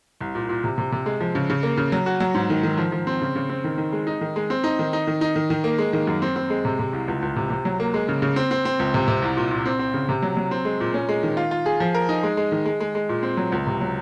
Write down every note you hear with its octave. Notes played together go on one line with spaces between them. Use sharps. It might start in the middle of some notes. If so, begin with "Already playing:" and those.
C2
A#2
A#2
C3
C3
C3
G#3
F3
C#3
C#3
A#3
C#3
F#3
F#4
F#3
G#2
D#3
D#3
F3
F3
C4
C#3
C#3
C4
D#3
D#3
G#3
D#4
D#3
G#3
C4
D#4
D#3
D#4
D#3
D#4
D#3
D#3
A#3
G#3
D#3
F#2
C4
C4
G#3
C3
C3
C2
C#2
C#2
C3
C3
F#3
A#3
G#3
C#3
C#3
C4
C4
C4
C#2
C3
C3
C2
A#2
A#2
C4
C4
C#3
C3
F#3
F#3
C4
G#3
A#2
C#4
G#3
D#3
F4
F4
G#4
F3
A#4
D#4
G#3
G#3
D#3
G#3
G#3
G#3
A#2
C4
F#3
C#2
C3
F#3